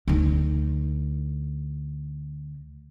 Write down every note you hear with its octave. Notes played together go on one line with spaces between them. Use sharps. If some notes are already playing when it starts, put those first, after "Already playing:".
D2 D#4